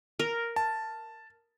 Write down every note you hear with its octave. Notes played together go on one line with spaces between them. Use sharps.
A#4
A5